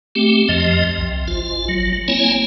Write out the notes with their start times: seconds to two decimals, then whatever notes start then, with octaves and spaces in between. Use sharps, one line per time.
0.15 A3 C4 G4
0.49 F2 F3 D#5
0.98 C2
1.28 G#1 F4
1.68 F#3
2.08 A#3 C4 E4 C#5 G#5